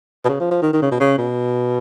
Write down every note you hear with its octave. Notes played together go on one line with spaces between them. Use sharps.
B2
C#3
F3
F3
D#3
D#3
C#3
B2
C#3
B2